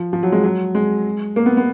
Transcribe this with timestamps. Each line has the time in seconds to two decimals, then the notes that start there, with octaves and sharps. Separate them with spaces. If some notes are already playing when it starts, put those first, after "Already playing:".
Already playing: F3
0.13 F3
0.23 F#3
0.32 G#3
0.44 F#3
0.75 G#3
1.36 A#3
1.46 B3
1.57 B3